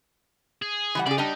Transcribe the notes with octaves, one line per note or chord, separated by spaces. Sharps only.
G#4
E3 G3 F#5
C#3 G#4 D5
G3 D4 D#4